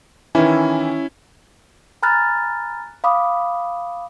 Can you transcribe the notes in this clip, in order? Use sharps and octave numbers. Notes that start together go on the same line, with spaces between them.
D#3 E3 C#4 E4
G#5 A#5 B5 F6 F#6 A6
F5 B5 D6 D#6